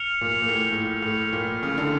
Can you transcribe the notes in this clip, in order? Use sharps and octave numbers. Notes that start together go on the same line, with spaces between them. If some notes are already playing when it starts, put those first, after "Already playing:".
Already playing: F6 C#7 F7
A#2
A#2
A2
A#2
A2
A2
A#2
C#3
D3